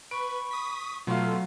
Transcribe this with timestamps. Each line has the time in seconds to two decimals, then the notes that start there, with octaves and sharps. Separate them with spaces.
0.11 B4 B5 C#6 D7
0.51 D#6 B6
1.07 B2 F#3 A3 F4 F5 C6